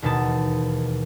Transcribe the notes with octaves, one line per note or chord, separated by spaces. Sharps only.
E1 D#2 B2 D#4 A5